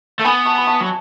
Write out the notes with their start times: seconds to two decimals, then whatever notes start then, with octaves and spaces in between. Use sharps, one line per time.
0.19 A3
0.25 B3 G#5 B5
0.45 A5 C#6
0.58 B5
0.67 A5 C#6
0.81 F#3